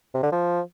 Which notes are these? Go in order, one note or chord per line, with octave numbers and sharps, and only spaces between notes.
C3
D3
F3